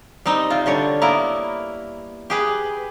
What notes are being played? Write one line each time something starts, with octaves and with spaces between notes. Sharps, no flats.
G3 C4 D#4
C3 F4
D3 G3 C#5
A#3 B3 E4 A#4
G4 G#4 B4